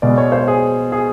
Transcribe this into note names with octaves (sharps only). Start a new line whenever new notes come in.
B2 G#3 D5
C#5
C5
G#4
G#4